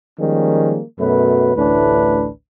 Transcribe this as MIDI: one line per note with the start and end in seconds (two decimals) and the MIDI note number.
0.20 0.82 51
0.20 0.82 53
0.20 0.82 55
0.20 0.82 56
0.20 0.82 58
0.20 0.82 61
1.00 1.54 42
1.00 1.54 47
1.00 1.54 54
1.00 1.54 57
1.00 1.54 71
1.56 2.29 33
1.56 2.29 38
1.56 2.29 45
1.56 2.29 52
1.56 2.29 62
1.56 2.29 71